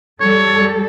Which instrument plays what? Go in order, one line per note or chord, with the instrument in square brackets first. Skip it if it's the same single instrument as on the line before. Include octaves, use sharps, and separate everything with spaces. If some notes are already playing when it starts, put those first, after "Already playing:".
[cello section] G3 A4 [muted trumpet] C#5